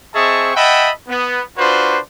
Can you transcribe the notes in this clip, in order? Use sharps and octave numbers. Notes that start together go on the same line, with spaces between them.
C4 G#4 D#5 E5 A5 C#6
D#5 E5 F#5 G5 A5 B5
B3
D4 F4 F#4 B4 C5